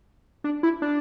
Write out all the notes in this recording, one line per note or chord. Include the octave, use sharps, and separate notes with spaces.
D4
E4
D4